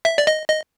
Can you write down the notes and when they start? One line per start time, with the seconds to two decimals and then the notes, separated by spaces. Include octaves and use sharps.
0.05 E5
0.18 D5
0.27 D#5
0.48 D#5